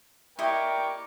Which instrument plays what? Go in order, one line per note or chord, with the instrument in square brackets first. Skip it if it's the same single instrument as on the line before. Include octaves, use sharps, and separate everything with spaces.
[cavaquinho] E4 G4 D#5 [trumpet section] A#4 D5 G5 [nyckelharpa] C#6 D6